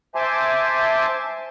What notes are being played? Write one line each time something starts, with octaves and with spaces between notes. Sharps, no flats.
C5 E5 G#5 A5 C6 D6